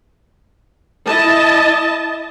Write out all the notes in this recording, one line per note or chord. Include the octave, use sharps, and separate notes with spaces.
E4 D#5 A5